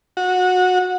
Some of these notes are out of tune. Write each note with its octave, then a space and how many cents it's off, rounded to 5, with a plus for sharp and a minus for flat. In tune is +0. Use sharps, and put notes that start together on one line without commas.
F#4 -20